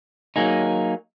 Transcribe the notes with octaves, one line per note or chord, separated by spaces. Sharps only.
F#3 A#3 D#4 G#4